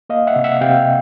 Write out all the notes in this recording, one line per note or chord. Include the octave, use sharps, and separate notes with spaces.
A#3 D#5 F5
E5 F#5
C3
E5 F#5
C3 F5 G5